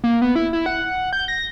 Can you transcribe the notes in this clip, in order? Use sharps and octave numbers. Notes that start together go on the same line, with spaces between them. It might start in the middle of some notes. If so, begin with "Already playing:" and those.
A#3
B3
E4
E4
F#5
G6
A#6